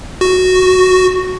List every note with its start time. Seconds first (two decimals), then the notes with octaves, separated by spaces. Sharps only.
0.21 F#4